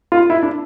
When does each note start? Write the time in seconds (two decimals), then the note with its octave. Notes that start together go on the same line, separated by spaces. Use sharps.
0.12 F4
0.30 E4
0.43 D4